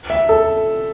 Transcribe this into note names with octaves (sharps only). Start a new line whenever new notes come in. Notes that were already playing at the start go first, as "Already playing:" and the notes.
E5
A4